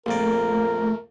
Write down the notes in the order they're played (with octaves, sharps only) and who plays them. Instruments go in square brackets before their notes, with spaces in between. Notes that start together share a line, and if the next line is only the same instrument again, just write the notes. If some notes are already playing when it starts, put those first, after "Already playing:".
[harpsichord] A#1 F2 D5 [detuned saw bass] A3 [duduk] A#4